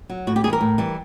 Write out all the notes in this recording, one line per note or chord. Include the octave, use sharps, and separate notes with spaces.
F#3
A2 F#4
G4
E3 G3 G#4
A#4
A2
E3 G3